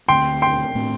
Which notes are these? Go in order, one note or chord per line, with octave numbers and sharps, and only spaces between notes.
D2 D3 A3 C4 G5 C6
G5 C6
A2 A3 C4